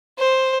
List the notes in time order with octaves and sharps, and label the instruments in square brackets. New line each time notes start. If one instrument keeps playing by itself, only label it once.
[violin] C5